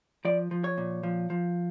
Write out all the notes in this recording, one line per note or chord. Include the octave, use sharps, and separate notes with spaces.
F3 D5
F3
C#5
A#2
F3
F3